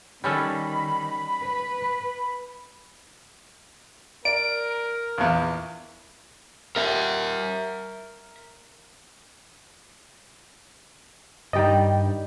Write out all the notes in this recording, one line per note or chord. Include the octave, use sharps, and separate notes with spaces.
D#3 G3 C#4 A4 B5
B4
A#4 D5 D7
A#1 E2
A#4 E5
G2 D#3 G3 D5 D#5 G5